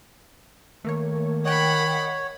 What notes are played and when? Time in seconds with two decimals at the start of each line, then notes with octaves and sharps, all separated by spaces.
0.84 D#3 A3 A#3 C#5
1.45 C#5 D#5 F#5 G5 B5